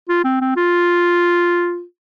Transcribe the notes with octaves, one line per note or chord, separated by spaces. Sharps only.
F4
C4
C4
F4